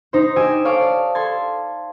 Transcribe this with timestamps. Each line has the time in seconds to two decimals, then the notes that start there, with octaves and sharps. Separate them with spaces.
0.13 D#4 C5
0.36 G4 D#5 G#5 D6 E6
0.64 A4 C#5 F5 A5 D6
0.81 D5
1.15 A4 C6 G#6 A6